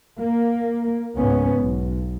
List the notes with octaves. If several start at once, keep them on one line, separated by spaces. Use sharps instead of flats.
A#3
C#2 G#2 B3 C#4
B1